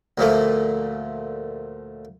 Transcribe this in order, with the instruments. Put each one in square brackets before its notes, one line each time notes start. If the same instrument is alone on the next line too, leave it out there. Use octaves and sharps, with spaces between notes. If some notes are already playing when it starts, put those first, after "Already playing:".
[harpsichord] D2 A#2 F3 A3